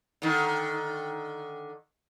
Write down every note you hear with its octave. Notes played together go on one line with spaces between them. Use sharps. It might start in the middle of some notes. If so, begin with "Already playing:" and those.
D3 D#3